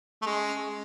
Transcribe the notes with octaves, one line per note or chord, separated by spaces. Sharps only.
A3
G#3 C#4
C#4